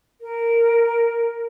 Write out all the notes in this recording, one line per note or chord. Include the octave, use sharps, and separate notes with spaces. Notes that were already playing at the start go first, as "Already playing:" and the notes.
A#4